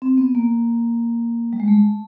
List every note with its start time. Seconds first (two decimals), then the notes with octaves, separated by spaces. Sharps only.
0.02 C4
0.18 B3
0.35 A#3
1.53 G3
1.60 G#3
1.68 A3